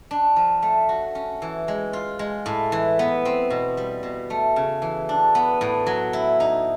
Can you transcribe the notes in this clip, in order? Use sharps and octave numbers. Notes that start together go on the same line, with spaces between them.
D4
F3
A3
F#4
C#4
E3
G#3
F4
G#3
A2
E3
B3
C4
B2
G3
B2
A3
C#3
E3
D4
B3
A2
F#3
E4
D#4